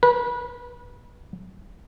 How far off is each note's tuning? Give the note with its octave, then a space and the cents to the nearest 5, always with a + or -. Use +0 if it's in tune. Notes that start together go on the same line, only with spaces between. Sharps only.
B4 -30